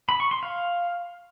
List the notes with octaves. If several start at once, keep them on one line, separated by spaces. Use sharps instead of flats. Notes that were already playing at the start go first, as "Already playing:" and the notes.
B5
C#6
C6
F5